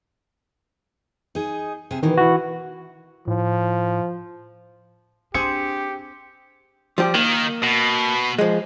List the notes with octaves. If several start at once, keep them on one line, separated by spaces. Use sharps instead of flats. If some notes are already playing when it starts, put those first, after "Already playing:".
D#4 G#4
C3 G#4
B2 D#3 E3
E4 F#4
A2 F3
C4 D4 G4 G#4 C5 C#7
F3 G3 G4
D#3 A#3
B2
F3 G#3